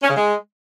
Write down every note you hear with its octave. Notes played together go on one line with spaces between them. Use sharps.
C#4
C#3
G#3